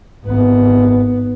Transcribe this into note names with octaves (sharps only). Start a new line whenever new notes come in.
G#1 B3